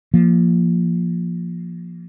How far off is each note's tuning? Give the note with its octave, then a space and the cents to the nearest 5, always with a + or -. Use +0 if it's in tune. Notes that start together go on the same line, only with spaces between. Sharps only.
F3 -15 A#3 +0